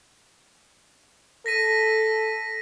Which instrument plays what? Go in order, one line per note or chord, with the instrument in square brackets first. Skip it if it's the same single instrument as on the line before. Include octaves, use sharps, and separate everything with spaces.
[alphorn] A4 [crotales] A#6 B6 D#7